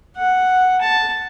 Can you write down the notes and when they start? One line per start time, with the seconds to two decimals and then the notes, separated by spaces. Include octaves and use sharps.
0.17 F#5
0.82 A5